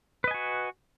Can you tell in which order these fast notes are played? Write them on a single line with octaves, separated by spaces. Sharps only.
B4 D#5 G#5 F#4